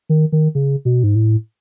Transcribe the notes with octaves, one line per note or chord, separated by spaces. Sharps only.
D#3
D#3
C#3
B2
G#2
A2